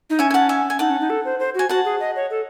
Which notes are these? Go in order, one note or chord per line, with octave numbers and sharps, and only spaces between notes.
D#4
C#4 E5 G#5
G#5
F#5 A5
E5 G#5
G#5
D#4 F#5 A5
C#4
D#4
A4
C5
C5
F#4 G#5
F#4 F#5 A5
G#4
D#5
C#5
A4